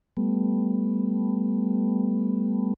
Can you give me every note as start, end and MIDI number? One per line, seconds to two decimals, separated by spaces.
0.17 2.74 55
0.17 2.74 57
0.17 2.74 59